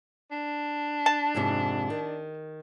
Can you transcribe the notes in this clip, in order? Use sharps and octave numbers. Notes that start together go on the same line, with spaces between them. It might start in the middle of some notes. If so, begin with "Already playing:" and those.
D4
A5
F2 G#2 C3
D#3